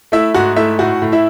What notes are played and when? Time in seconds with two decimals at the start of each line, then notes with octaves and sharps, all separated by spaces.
0.12 A3 E4 E5
0.34 G#2 F#4 F#5
0.56 A3 E4 E5
0.79 A2 F#4 F#5
1.02 A2
1.12 E4 E5